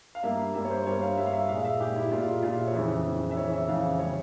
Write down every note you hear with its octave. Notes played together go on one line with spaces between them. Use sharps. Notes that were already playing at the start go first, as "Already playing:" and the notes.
F5
G2 G3 A#3 E5
G2 G3 A#3 E5
C#5
C5
G2 G3 A#3 C#5
F5
G2 G3 A#3 E5
F5
E5
A#2 G#3 F5
E5
A#2 G#3 G4
E4
A#2 G#3 F4
A#2 G#3 F4
E5
C#5
F2 C#3 E3 E5
F2 C#3 E3
E5
F2 C#3 E3 C#5
E5
F2 C#3 E3 F5
C#3 G3 C#5